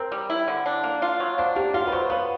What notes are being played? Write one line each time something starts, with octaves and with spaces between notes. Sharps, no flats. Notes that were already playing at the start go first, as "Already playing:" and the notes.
Already playing: C4 A#4
G3
E4
D3
D4
A#3
F4
F#3
D4 C5
A#3 G4
F4 F#4
B4
F#3 C5
B3 B4